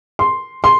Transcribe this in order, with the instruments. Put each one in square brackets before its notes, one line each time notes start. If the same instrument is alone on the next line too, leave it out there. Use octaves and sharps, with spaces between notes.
[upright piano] C6
C6